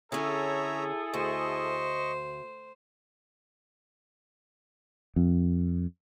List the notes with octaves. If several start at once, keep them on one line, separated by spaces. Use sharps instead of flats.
D3 C#4 E4 G#4 A4 C#5 E5 A#5
D2 C5 D#5 C#6
F2